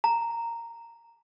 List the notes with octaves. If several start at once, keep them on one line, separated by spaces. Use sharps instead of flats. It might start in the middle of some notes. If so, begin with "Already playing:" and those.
A#5